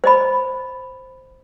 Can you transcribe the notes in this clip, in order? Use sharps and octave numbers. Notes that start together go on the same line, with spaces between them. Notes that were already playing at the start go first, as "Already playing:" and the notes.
C5 D#5 B5